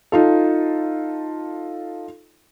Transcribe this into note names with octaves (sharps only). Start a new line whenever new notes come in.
D#4 F4 A4